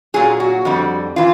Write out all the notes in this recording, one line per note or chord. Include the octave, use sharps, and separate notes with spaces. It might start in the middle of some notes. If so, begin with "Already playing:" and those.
A#2 F#3 G#4
F#4
F2 D3 G3
E3 F4